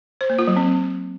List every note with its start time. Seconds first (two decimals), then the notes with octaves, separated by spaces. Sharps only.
0.21 C5
0.30 A#3
0.39 F4
0.48 F#3
0.57 C4